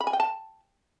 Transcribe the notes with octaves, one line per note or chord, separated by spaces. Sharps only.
B5
G#5
G5
A5